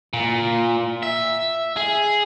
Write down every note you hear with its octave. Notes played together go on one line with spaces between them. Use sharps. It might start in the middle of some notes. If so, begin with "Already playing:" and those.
A#2
E5
G#4